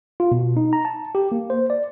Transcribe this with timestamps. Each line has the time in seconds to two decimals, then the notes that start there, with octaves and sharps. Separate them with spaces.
0.20 F4
0.32 B2
0.57 D#4
0.73 A#5
0.85 A5
1.15 G4
1.32 A#3
1.50 C5
1.70 D5